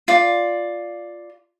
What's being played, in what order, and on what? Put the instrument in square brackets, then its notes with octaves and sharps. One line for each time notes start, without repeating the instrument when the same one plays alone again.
[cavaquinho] F4 D5